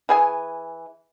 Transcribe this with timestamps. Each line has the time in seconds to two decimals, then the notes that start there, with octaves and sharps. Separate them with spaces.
0.09 E3 G#4 G#5